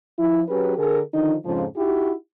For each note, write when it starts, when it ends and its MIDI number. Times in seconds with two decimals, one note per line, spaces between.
0.19 0.43 53
0.19 0.43 64
0.49 0.77 54
0.49 0.77 61
0.49 0.77 67
0.49 0.77 68
0.49 0.77 71
0.78 1.00 50
0.78 1.00 68
0.78 1.00 70
1.14 1.34 50
1.14 1.34 51
1.14 1.34 53
1.14 1.34 63
1.46 1.65 41
1.46 1.65 44
1.46 1.65 49
1.46 1.65 53
1.76 2.13 63
1.76 2.13 64
1.76 2.13 66
1.76 2.13 67